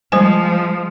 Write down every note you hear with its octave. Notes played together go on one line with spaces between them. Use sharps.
F3 G3 G#3 C5 G#5